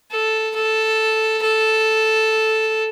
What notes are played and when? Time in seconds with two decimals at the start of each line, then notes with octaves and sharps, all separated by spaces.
0.11 A4
0.55 A4
1.42 A4